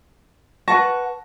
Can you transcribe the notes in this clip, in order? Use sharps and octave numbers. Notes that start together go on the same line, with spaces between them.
B4 F#5 A5 C#6 A#6